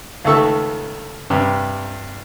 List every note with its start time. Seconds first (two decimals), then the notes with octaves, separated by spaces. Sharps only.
0.25 C#2 D#3 A3 A4 C#6 E6
1.30 G2 C3 G3 G4